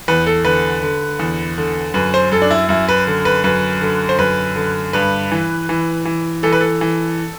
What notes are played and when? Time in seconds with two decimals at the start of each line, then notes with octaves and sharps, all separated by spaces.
0.08 E2 B4
0.27 A4
0.45 D3 B4
0.82 D3
1.19 E2
1.58 D3
1.94 F#2 B4
2.14 C5
2.32 F#2 A4
2.42 D4
2.51 E4
2.69 F#2 E4
2.89 B4
3.07 D3
3.25 B4
3.44 F#2 B4
3.81 D3
4.09 C5
4.18 F#2 B4
4.56 D3
4.93 G2 B4
5.32 E3
5.69 E3
6.05 E3
6.43 E3 A4
6.53 B4
6.61 A4
6.81 E3